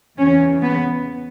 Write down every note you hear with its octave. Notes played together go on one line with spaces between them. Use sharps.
E2 C#3 E3 C#4
B3